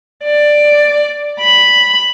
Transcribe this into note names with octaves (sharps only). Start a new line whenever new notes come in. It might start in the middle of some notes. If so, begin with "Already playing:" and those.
D5
B5